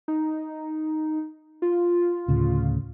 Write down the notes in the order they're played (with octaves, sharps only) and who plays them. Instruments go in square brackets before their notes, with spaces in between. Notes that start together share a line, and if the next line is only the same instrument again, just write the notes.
[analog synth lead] D#4
F4
[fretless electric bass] D2 A2 C#3